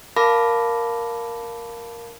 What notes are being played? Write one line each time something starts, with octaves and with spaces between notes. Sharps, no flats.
A#4 F5 A5 B5 D6 A#6